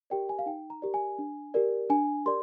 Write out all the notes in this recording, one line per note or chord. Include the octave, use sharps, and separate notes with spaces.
G4 A#4 D5 G5
G#5
F5
D#4 G5
A#5
G4 A#4 D5
G#5
D4
G4 A#4 D5
D4 G#5
G4 A#4 D5 C6